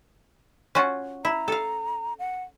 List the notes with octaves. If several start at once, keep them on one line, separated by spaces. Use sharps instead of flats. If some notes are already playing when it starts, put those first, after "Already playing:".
C#4 F4 F#4
E4 A#5
A4 F5
F#5